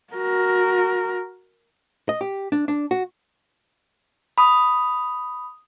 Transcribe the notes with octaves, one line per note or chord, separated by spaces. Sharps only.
F#4 A#4
D#5
G4
D4
D4
F#4
B5 D#6